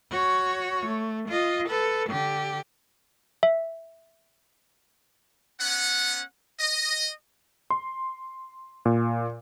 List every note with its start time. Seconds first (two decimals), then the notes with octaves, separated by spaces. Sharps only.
0.11 F#4 C#5
0.86 A3
1.28 F4 D#5
1.68 A4 B4
2.09 D3 G4
3.43 E5
5.59 B3 C#4 F#5
6.60 D#5
7.70 C6
8.85 A#2